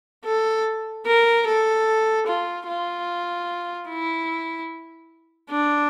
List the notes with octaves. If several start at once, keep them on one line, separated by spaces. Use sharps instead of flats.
A4
A#4
A4
F4
F4
E4
D4